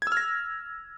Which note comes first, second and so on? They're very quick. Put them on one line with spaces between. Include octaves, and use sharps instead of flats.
G#6 E6 F6 A#6